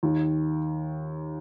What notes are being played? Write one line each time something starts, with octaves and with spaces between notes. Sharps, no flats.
D#2 D#3